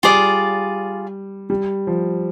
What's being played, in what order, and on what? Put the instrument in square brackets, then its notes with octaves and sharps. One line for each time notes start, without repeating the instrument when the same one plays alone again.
[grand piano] G3 [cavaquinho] F4 G#4 D5
[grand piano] G3
F3